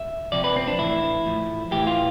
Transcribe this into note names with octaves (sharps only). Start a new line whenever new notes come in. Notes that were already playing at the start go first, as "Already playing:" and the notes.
Already playing: E5
C3 F3 D5
B4
C4
D4
A2 E3 E4
A2 F3
A2 E3 G4
F4